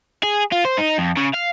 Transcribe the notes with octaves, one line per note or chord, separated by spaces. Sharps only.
G#4
F4
C5
D#4
F2
C#3
F5